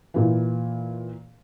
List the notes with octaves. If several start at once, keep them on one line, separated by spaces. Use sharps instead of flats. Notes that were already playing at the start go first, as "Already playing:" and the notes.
A#2 E3